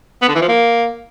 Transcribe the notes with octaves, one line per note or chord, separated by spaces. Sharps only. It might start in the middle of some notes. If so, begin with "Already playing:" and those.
B3
D3
E3
F3
A#3